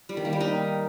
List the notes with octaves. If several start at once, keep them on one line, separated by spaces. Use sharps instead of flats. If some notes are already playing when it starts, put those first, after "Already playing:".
G3
D#3
A#3
G3
D#4